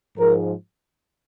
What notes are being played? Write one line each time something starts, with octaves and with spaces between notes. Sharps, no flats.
G#2 F3 G#3 A#4